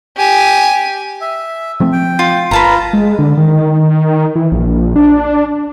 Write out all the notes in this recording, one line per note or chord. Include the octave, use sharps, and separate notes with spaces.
G4 G#5
E5
F3 A3 C4
G5
F4
G1 F4 B4 A5 A#5
G#3
D3
D#3
E3
A#1
D4